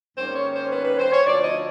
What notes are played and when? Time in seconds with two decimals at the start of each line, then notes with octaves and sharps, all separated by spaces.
0.16 G#2 D#3 G3 A#3 C#4 C5
0.35 C#5
0.53 C5
0.70 B4
0.84 B4
0.98 C5
1.11 C#5
1.25 D2 D3 F3 D5
1.42 D#5